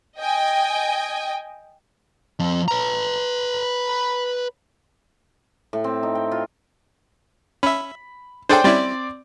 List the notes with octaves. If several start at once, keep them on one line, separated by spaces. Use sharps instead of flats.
D#5 G5 G#5
F3 C4
B4 A#5
A2
C4
D#4
G5
F4
C#4 E5 B5
D4 G#4 A4 C5 D5 G5
G3 C4 C#4 E4 D5